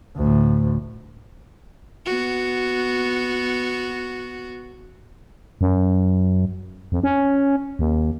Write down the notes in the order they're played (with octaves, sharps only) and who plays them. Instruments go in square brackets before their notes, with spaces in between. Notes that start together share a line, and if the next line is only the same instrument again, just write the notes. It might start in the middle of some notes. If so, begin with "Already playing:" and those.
[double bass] D2 A2
[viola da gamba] B3 F#4
[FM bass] F#2
F2
C#4
D#2